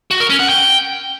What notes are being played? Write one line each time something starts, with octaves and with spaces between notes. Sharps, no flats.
F#4
A#4
C#4
F#5
G5